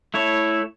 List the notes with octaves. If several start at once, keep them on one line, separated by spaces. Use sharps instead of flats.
A3 E4 A4 C#5